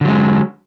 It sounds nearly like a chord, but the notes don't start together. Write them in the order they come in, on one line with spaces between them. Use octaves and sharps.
D3 F#3 G#3